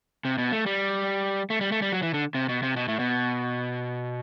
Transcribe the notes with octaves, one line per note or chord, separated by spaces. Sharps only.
C3
B2
A3
G3
A3
G3
A3
G3
F#3
E3
D3
C3
B2
C3
B2
A2
B2